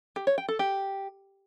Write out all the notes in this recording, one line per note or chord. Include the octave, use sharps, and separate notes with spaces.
G4
C#5
G5
A4
G4